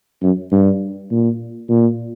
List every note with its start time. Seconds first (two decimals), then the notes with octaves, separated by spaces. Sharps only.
0.23 F#2
0.52 G2
1.11 A#2
1.69 A#2